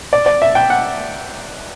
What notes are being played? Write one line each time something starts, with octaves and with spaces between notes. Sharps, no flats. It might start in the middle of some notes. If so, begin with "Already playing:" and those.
D5
D5
E5
G5
F#5